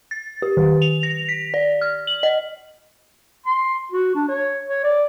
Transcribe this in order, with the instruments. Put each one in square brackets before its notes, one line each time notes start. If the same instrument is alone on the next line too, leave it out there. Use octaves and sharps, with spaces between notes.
[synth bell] A6
G4
D#3
F7
A#6
B6
D5
F6
F#7
D#5
[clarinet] C6
F#4
D4
C#5
C#5
D5